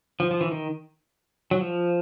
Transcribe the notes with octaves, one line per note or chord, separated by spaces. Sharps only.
F3
F3
E3
D#3
F#3
F3